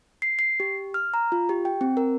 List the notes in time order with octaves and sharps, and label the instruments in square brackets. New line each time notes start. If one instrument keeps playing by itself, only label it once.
[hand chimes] C7
C7
G4
F6
A#5
F4
G4
G5
C4
A#4